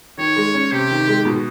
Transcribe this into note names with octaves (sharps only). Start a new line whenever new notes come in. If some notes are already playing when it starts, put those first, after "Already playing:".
D#3 C#5
G#3
C#4
C3 G4
D#3
G#3
B2